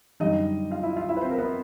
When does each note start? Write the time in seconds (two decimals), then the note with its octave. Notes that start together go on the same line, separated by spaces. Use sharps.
0.20 F#2 D3 G3 D#4 D#5
0.71 F4 F5
0.83 E4 E5
0.96 F4 F5
1.09 E4 E5
1.17 B4
1.21 C4 C5
1.31 A#4
1.38 B3 B4